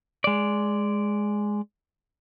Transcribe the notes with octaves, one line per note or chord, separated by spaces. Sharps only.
G#3 D5